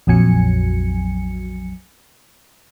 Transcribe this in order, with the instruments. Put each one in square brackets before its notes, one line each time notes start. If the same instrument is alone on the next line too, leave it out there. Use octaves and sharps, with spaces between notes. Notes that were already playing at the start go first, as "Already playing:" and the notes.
[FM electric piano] A#1 F2 F#3 G#5 C#7